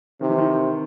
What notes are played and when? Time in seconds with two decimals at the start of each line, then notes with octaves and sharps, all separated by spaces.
0.21 C3 D#3
0.29 E3
0.38 D#3